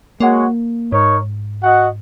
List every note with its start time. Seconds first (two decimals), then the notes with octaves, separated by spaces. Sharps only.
0.20 G#3 A#3 F#4 C#5 F#5
0.92 G#2 D#4 A#4 C#5
1.63 F#4 D#5 F#5